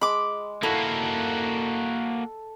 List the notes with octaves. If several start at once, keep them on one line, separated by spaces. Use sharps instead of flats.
G#3 B5 D6
A#3 E4 F#4 A4